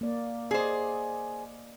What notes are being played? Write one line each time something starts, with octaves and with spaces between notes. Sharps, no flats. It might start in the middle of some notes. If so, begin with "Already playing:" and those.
A#3 D5
G#4 C5 D5 D#5